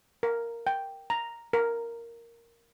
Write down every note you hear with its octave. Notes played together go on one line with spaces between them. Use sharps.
A#4
G5
A#5
A#4